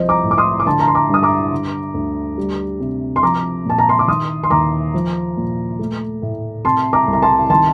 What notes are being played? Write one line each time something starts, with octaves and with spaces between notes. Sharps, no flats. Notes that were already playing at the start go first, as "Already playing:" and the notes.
Already playing: C2 F3 C5 D#5
A#5 D6
A2
D6
C6 D#6
D6
D3 A5 C6
A#5
C6
A#5 D6
G2 D#6
A#5 D6
D3
D2
G3
C3
C6
F3 A#5 D6
A#2 A5
A#5
C6
D6
D#3 C6 D#6
C6
D#2 A#5 D6
F3
A#2
A3
A2
C3 A5 C6
A#5 D6
C2
A#5
A5 C6
D#3 A5 C6